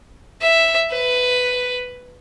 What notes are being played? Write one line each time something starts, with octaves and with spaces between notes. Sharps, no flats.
E5
B4